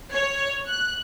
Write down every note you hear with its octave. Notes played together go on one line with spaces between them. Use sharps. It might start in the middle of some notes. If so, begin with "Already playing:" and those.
C#5
F#6